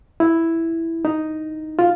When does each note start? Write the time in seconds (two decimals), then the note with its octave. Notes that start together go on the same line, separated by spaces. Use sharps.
0.20 E4
1.05 D#4
1.79 F4